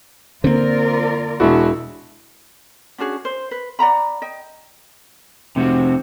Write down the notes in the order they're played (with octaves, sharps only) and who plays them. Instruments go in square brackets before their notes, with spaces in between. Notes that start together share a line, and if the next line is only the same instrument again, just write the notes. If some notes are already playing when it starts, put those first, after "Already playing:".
[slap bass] D3 A#3 [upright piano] C4 [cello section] F4 A#4 D5
[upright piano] E1 E4 [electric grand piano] G#3 D4 F#4
[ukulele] C#4 D4 F#4 G#4
C5
B4
D5 F#5 A#5 B5
D#5 G5
[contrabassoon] F1 [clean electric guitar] C3 C4 F#4